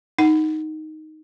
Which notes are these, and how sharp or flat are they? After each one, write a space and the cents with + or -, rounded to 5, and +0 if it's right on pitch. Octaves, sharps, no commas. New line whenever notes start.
D#4 +0 F#5 +0